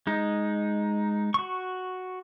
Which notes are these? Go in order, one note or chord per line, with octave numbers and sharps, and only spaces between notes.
G#3 D#4
F#4 C#6